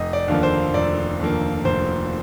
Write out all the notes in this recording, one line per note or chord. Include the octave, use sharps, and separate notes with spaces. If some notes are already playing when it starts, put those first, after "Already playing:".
Already playing: F1 D#5
D5
D#2 D3 F3 A#3
C5
F1 D5
D#2 D3 F3 A#3
F1 C5